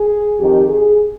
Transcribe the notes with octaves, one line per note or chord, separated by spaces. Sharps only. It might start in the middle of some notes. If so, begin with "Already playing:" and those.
Already playing: G#4
F2 D#3 G4
G#4